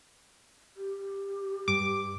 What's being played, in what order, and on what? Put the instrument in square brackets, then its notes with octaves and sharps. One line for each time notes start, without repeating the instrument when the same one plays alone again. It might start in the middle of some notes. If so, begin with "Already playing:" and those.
[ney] G4
[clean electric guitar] G2 [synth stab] D6